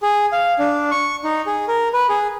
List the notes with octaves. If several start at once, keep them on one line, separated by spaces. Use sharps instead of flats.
G#4
F5
D4
C#6
D#4
G#4
A#4
B4
G#4